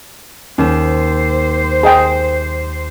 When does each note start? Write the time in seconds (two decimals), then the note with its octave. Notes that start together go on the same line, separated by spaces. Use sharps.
0.58 D#2 C#4 C5 E7
1.83 G#4 D#5 G5